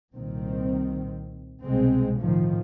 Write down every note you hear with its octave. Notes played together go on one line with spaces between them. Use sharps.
C2 A#2 D#3 C4
C2 B2 G#3 C4
A2 D#3 F3